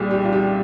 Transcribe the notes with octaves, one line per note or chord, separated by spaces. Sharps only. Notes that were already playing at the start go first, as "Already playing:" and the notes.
Already playing: C2 A#2 G3 G#4
G4
F4
G4